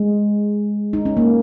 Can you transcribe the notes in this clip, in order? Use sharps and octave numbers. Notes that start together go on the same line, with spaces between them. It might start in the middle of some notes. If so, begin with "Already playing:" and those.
Already playing: G#3
D#4
C#4
A#3